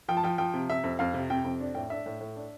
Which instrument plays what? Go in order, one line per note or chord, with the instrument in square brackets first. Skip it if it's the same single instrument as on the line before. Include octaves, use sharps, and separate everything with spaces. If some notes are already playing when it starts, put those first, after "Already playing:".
[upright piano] F3 G5
A5
F3 G5
F3 G5
C3
C3 E5
F2
F2 F5
C3
C3 G5
F2
D4
A2 G5
D4 E5
A2
A2
D4